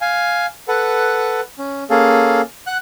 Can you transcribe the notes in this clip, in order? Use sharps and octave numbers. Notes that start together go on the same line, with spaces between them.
F5 G#5
A4 B4 F#5
C#4
A#3 C#4 G#4 A4 F5
F#5 F#6